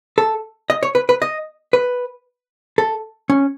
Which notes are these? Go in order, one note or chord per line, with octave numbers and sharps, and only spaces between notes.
A4
D#5
C#5
B4
B4
D#5
B4
A4
C#4